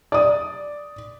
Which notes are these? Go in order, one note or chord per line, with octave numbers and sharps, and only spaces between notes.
D5 D#6